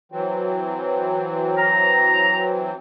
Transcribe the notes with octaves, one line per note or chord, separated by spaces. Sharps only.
E3 F#3 C4
A#5